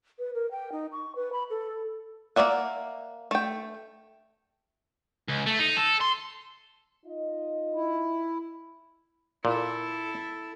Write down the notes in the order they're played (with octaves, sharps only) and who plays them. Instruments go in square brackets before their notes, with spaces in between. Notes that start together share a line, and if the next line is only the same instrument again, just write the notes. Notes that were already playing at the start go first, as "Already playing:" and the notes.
[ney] B4
A#4
G5
D#4
C#6
B4
B5
A4
[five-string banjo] A#3 B4 D5 E5 F#5
A3 G5
[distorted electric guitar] C#2
A3
D#4
A4
C6
[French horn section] D#4 F4 D#5
[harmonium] E4
[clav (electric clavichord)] A#2 [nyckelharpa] E4 A4